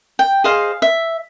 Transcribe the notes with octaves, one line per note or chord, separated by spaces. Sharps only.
G5
G#4 C5 D#5 F5
E5